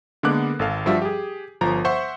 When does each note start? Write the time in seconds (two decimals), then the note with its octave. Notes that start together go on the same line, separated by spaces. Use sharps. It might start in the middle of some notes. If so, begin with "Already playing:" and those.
0.23 D3 G#3 A#3 B3 D6 F#6
0.59 G#1 A4 F5
0.86 G2 F3 G3 F#4 E5
1.02 G4 G#4
1.61 G1 F3 A#5
1.85 C5 E5 F#5 C6 C#6